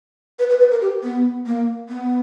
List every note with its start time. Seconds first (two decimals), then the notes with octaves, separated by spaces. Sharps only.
0.39 B4
0.50 B4
0.60 B4
0.71 A#4
0.81 G4
1.03 B3
1.46 A#3
1.89 B3